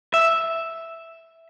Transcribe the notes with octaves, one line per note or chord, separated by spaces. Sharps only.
E5